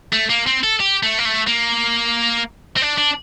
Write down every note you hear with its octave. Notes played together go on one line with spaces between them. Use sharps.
A3
A#3
C4
A4
G4
A3
A#3
A3
A#3
C4
D4
D4